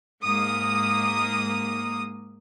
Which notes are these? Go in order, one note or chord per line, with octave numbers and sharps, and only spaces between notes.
G#2 A#3 D#6